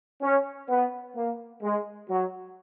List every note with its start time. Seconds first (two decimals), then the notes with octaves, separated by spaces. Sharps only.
0.22 C#4
0.69 B3
1.16 A#3
1.63 G#3
2.09 F#3